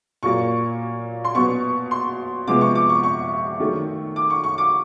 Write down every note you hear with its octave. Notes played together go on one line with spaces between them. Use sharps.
A#2 F#3 A#3 C#6
C6
B2 F#3 B3 C#6
C6
C3 F3 G#3 B3 D6
C#6
D6
C#6
C#6
D#3 F#3 A3
D6
C#6
C#6
D6